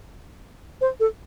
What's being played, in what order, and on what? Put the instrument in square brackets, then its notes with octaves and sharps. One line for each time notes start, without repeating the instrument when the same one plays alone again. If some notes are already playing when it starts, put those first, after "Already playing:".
[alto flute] C5
A4